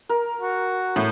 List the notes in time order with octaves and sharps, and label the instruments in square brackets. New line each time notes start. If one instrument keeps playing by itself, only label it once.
[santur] A#4
[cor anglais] F#4
[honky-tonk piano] A2